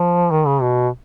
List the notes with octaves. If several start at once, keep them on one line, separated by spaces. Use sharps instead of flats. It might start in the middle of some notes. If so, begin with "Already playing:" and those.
Already playing: F3
D#3
C#3
B2